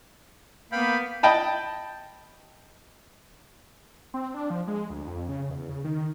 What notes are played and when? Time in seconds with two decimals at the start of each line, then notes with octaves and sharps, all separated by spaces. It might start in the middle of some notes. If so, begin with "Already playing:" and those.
0.72 A#3 B3 F5 G5 B5
1.23 D#5 G5 A5 B5
4.14 C4
4.34 D4
4.50 F3
4.68 G#3
4.90 D2
5.07 F2
5.29 C#3
5.50 E2
5.69 C#3
5.84 D#3